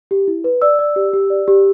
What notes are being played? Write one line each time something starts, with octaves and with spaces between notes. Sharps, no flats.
G4
E4
B4
D5 E6
D5
G4
G4
D5
G4